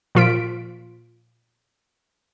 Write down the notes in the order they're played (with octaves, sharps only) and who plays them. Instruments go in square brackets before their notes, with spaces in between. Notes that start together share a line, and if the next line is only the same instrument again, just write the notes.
[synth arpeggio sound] A#2 F3 F4 B6 D7